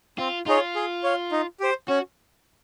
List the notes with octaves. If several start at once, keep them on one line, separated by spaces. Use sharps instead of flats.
C4 F4
D#4 F4 G#4 C#5
G#4
C#5 F5
D#4
G4 C5
C#4 F#4